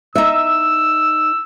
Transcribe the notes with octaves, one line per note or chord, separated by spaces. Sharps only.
D#4 E5 E6